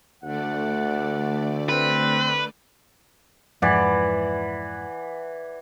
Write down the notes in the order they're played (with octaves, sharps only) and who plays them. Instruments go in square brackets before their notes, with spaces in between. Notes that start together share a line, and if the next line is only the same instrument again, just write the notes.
[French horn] D2 [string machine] D3 A3 D5 [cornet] F#5
[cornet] C4 [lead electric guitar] B4
[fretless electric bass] F2 G#2 [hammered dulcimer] E3 D5 F#5